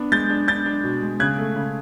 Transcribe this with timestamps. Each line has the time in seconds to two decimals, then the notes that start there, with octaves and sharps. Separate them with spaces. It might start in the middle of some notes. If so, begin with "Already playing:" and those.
Already playing: B3 D4
0.12 G#3 G6 A6
0.30 D4
0.48 D4 G6 A6
0.66 D4
0.83 B2
1.02 G#3
1.20 C#3 F#6 G#6
1.38 A3
1.56 C#3